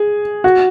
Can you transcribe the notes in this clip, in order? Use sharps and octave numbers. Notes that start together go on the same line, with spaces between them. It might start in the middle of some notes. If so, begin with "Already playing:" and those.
Already playing: G#4
F#4